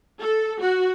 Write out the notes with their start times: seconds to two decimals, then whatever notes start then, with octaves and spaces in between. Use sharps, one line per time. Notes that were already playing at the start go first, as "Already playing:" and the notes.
0.20 A4
0.61 F#4